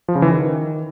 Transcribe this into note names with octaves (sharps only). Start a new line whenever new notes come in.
F3
C#3
E3
D#3